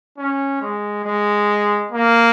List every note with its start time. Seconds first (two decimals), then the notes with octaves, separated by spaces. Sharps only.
0.18 C#4
0.61 G#3
1.04 G#3
1.92 A#3